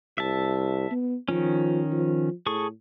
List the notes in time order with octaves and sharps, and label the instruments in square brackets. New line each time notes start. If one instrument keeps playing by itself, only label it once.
[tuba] C2 [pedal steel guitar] E5 A5
[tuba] B3
[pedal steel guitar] D#3 C#4 [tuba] F3
[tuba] F3
[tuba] A2 [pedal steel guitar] G#4 A4 C#6